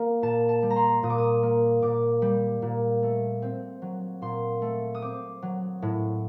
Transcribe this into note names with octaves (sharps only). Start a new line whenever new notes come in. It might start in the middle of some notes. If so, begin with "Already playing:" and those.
Already playing: A#3
A#2 A5
A5
G3
A#5
C6
A#2 D#6
D6
D#6
A#3
A#2 D6
G3
A#2
A3
C4
F#3
A#2 C6
A3
D#6
C4 D6
F#3
A2